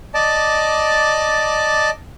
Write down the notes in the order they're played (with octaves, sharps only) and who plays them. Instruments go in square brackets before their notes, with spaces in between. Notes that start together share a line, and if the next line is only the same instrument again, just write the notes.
[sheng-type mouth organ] D5 D#5 A5 D6